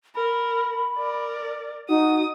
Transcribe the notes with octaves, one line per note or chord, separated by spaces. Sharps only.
A#4 B5
A#4 D5
D#4 F#4 D#6